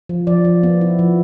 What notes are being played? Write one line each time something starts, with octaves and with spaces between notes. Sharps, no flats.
F3
F3 D5
F3
B3
E4
F3